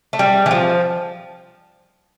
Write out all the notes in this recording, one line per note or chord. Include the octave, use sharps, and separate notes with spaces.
A3
G3
E3
F3